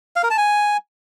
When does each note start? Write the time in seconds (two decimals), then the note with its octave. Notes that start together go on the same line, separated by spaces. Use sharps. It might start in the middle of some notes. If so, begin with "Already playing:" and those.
0.16 F5
0.23 A#4
0.30 A5
0.38 G#5